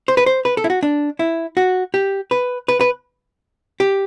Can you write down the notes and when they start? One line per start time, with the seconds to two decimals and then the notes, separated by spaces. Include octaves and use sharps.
0.08 C5
0.17 B4
0.26 C5
0.45 B4
0.57 A4
0.64 E4
0.70 F#4
0.83 D4
1.19 E4
1.57 F#4
1.94 G4
2.31 B4
2.68 B4
2.81 B4
3.80 G4